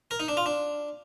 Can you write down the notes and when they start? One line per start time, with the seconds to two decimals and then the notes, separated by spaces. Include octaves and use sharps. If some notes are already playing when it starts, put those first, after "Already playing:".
0.11 A#4
0.20 D#4
0.28 D4
0.37 F4
0.46 D4